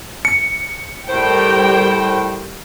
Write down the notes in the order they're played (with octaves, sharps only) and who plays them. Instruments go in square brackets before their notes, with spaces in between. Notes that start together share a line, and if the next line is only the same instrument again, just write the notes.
[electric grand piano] C#7
[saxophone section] A2 C5 [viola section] G3 A#4 G5